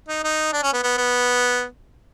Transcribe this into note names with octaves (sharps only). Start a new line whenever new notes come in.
D#4
D#4
D4
C#4
B3
B3
B3